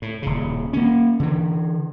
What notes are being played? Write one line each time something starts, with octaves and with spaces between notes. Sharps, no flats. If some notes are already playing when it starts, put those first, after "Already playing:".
A2
D#1 C#3
A#3 C#4
D3 E3